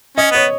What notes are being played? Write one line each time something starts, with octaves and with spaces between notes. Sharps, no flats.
C#4 D#5
B3 C#5